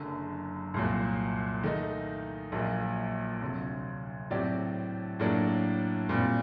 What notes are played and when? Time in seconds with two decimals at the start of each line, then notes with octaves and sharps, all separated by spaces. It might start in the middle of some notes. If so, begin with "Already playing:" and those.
Already playing: F#1 F#2 D3
0.74 C2 A#2 F#3
1.63 D#3 A3 D#4
2.52 A#1 A#2 F#3 A#3
3.42 D2 C3 F#3
4.30 A2 F#3 C4 G4 D5
5.20 A2 F#3 A#3 D4
6.09 A#2 G3 C4